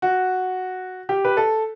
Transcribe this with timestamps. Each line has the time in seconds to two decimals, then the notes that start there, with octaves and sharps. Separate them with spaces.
0.02 F#4
1.09 G4
1.25 B4
1.37 A4